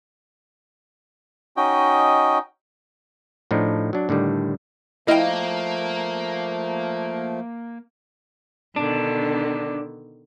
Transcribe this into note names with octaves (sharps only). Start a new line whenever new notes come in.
C#4 D#4 F#4 D#5 G5
A2 F3 D4 D#4
F#3 D4
A2 D3 D#3 G3
F3 A3 A#3 E4 D#5 F5 G5
B2 D3 D#3 D4